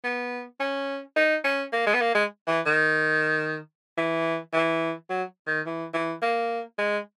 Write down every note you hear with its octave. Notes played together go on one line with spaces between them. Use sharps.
B3
C#4
D#4
C#4
A#3
G#3
B3
A#3
G#3
E3
D#3
E3
E3
F#3
D#3
E3
E3
A#3
G#3